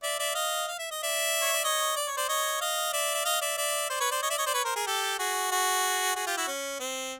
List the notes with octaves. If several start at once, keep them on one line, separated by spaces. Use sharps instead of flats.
D5 E5
D5 E5
D#5 F5
F5
E5
D#5
D5 E5
C#5
D5
C#5 D#5
D5
C#5
C5 D5
C#5 D#5
D#5 F5
D5 E5
E5
D#5 F5
D5 E5
D5 E5
C5 D5
B4 C#5
C5 D5
C#5 D#5
D5 E5
C#5 D#5
C5 D5
B4 C#5
A#4 C5
G#4 A#4
G4 A4
F#4 G#4
F#4 G#4
F#4 G#4
F4 G4
E4 F#4
C#4
C4